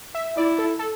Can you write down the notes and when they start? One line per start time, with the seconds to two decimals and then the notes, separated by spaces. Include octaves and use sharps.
0.15 E5
0.37 E4 D5
0.59 A4
0.79 A4